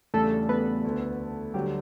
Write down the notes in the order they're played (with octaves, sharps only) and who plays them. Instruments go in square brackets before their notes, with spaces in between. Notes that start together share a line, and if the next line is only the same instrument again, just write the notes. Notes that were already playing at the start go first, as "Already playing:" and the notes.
[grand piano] E2 C#3 G3 D4 [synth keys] A3 A4
[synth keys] B3 B4
[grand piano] D2 D3 A3
[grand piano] D2 D3 F#3 A3 [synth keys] G3 G4